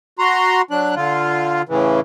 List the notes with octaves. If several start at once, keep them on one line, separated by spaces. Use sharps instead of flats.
F#4 A#5 C6
F#3 D4 F#6
D3 F4
A2 C#3 E3